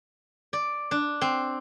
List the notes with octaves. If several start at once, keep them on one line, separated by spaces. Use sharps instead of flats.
D5
D4
C4